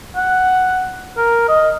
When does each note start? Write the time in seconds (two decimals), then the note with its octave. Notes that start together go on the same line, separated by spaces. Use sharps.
0.16 F#5
1.17 A#4
1.49 D#5